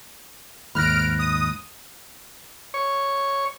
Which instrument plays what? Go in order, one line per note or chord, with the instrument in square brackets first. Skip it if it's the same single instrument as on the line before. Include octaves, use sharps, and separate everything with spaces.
[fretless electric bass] D#2 G#2 [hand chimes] B5 F#6 A#6 [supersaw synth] F6 D7
[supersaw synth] D#6
[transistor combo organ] C#5